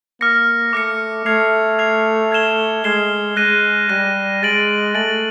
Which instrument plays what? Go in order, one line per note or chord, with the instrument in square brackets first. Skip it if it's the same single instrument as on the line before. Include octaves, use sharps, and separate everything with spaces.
[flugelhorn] A#3 [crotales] D6 F6 A#6 C#7
[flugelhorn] A3 [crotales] D6 F6 A#6 C#7
[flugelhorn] A3 [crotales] F6 G#6 C7 F7
[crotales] F6 G#6 C7 F7
F6 G#6 C7 E7 G7
[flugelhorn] G#3 [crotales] F6 G#6 C7 E7 G7
[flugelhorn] G#3 [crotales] F#6 A#6 D#7
[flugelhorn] G3 [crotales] F#6 A#6 D#7
[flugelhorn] G#3 [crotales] A6 D7 F#7
[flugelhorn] A3 [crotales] A6 D7 F#7